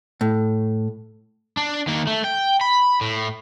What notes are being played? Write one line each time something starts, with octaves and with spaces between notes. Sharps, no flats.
A2
D4
D#3 A#3
A3
G5
B5
A2